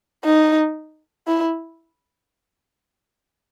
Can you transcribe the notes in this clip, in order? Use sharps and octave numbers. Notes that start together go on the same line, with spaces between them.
D#4
E4